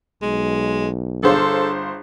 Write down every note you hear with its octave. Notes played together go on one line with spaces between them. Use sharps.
B1 G#3
G1 D4 G#4 A4 C5 C#5 F5